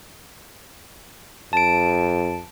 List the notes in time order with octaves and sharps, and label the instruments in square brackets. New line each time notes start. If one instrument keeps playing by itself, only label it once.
[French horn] F2 [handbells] A5 D7